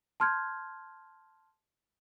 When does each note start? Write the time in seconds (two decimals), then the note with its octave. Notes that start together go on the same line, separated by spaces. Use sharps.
0.20 A5 C6 F6 G6 G#6